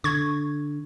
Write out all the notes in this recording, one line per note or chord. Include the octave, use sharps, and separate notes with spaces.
D3 C#6 G#6